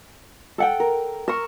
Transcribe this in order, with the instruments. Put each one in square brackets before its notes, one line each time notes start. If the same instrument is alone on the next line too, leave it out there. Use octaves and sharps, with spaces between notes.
[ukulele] A4 F#5 G5
[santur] A#4
[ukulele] A#4 [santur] C#6 E6